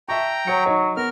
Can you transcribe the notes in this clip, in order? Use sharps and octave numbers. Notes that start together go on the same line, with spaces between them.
E5 G5 A5 A#5 C#6
F#3 C#5 C#7
D#4 C#5 C#6
B3 A#4 F6